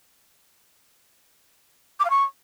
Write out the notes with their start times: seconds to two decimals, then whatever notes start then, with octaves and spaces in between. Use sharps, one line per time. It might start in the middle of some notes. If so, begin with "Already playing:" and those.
1.99 D6
2.05 F5
2.10 C#6